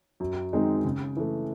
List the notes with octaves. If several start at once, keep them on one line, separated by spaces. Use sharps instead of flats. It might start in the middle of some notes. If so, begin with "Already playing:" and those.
F#2
D#3 G#3 C4 D#4
C#3
E3 A3